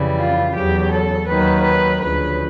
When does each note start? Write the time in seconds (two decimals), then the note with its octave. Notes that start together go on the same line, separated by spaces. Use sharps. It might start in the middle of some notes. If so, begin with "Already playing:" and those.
Already playing: F2 C#3 E3 G3
0.18 F4
0.54 E2 C#3 F#3 G4
0.91 A4
1.27 D#2 D#3 F#3 B4
1.63 B4
2.00 D2 C#3 F3 B4